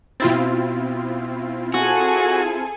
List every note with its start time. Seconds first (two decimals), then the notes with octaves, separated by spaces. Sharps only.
0.20 B2 C4 E4 F4 A6
1.74 F#4 G#4 A4 G#5